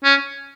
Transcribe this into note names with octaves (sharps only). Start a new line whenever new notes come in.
C#4